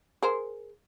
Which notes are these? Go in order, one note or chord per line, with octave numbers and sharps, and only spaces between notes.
G#4 A#4 C5